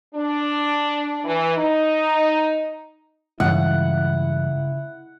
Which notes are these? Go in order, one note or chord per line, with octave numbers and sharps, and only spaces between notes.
D4
E3
D#4
C#2 G2 E3 G3 E4 F#5